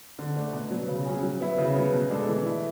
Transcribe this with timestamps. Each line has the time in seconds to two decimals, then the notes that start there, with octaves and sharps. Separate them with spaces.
0.19 D3
0.36 A3 D4
0.53 B2
0.71 F#3 B3
0.88 C#3
1.06 F#3 C#4 G#4
1.23 F#3
1.40 B3 E4
1.58 C#3
1.75 F#3 B3
1.93 B2
2.10 G#3 D4 A4
2.28 E3
2.46 A3 E4